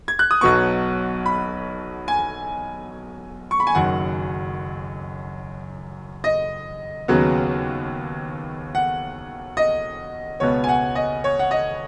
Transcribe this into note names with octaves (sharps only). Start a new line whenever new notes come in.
G#6
F#6
D#6
B1 B2 F#3 B3 C#6
B5
G#5
C#6
B5
G#5
F#1 F#2 D#3 F#3 F#5
D#5
D#2 C#3 F#3 B3
F#5
D#5
C#2 B2 B3 C#5
G#5
F#5
D#5
C#5
F#5
D#5